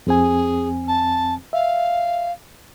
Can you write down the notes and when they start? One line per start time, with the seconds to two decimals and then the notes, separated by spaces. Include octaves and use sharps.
0.07 F2 C4 G#4 G#5
0.87 A5
1.53 E5 F5